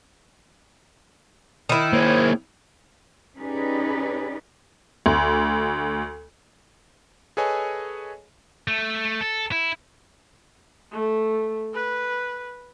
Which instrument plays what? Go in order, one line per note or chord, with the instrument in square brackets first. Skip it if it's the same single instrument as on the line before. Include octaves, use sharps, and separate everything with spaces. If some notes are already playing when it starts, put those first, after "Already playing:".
[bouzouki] D#3 E4
[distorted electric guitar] A#3 G#4 [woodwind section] C5 C#5
[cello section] C#4 D#4 G4 G#4 B4 D5
[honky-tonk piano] D2
[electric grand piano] G#4 A4 B4 C#5 D#5 G#5
[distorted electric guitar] A3
A4
E4
[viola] A3
B4